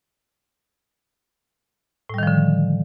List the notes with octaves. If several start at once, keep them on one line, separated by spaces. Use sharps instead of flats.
A2 D3 D#3 F3 G3